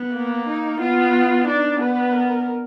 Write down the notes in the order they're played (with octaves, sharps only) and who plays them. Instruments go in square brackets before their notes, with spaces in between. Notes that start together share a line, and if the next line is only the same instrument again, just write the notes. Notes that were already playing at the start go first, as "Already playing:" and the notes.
Already playing: [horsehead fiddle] B3
[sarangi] A#3
[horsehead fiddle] D#4
[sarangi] B3 [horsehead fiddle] F4
[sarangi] D4 [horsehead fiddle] D#4
[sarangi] B3 [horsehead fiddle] B4
[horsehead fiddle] A#4